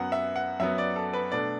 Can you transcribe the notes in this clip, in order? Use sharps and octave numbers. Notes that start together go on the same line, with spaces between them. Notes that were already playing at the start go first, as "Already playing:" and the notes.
Already playing: F#2 F#3 B3 F#5
E5
F#5
F#2 F#3 B3 E5
D5
A4
B4
B2 A3 D4 D5